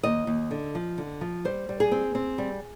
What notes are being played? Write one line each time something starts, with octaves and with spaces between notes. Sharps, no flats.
D#2 D#5
D#2
D3
F3
D3
F3
G3 C5
G3
G#4
C4
C4
G3